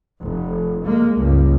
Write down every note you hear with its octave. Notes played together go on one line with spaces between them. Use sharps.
F1
G#3 A#3
C#2 G2